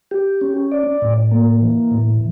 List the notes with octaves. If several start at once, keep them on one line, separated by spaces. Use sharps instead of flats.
G4
C#4
D5
A2
A#3
E3
A2